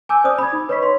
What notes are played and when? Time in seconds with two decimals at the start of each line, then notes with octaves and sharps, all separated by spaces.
0.09 G#5 A5 D6 E6 G6
0.24 C5 D5 D6 D#6
0.38 B5 D#6 G#6
0.53 D#4
0.69 B4 C#5 D#5 B5 C#6 B6
0.82 C6